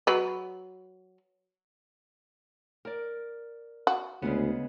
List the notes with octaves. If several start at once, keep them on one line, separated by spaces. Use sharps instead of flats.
F#3 B4
A#4 D5
F#4
D2 C#3 G#3 B3